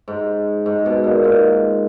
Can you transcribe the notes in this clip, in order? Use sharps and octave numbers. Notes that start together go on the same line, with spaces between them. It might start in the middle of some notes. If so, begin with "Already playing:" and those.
G#2
G#2
B2
A#2
G#2